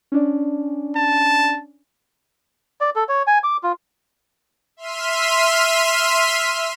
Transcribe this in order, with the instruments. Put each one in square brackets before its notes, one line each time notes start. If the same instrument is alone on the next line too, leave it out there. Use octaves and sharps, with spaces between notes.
[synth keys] C#4 D4 D5
[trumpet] A5
[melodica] D5
A4
C#5
G#5
D6
F4
[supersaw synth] E5 C6 F6 B6 D#7